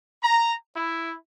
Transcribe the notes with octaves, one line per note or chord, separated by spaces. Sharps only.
A#5
E4